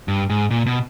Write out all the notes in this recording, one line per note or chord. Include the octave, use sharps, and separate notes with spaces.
G2
G#2
A#2
B2